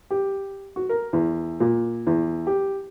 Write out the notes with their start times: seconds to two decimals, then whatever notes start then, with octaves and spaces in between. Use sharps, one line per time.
0.11 G4
0.76 F#4
0.89 A#4
1.13 E2
1.60 A#2
2.07 E2
2.47 G4